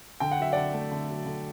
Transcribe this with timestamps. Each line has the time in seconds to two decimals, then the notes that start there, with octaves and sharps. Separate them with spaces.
0.20 D3 G5
0.31 F#5
0.39 F#3 E5
0.52 D3 D5 F#5
0.74 A3
0.92 D3
1.09 F#3
1.26 D3